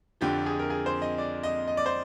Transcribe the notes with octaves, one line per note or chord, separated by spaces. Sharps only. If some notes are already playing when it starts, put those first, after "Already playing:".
F2 D3 F3 G4
G#4
A#4
G#4
C5
D#5
D5
D#5
D#5
D5
C5